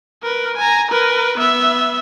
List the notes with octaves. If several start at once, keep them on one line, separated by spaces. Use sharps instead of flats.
A#4 B4
G#5 A#5
A#4 B4
B3 E5